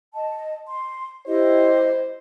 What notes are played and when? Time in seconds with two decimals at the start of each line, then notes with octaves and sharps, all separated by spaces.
0.14 D#5 A5
0.67 C6
1.26 E4 G4 C5 D#5